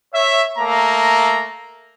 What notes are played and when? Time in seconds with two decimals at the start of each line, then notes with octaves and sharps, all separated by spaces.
0.14 C#5 E5
0.58 A3 A#3 A#5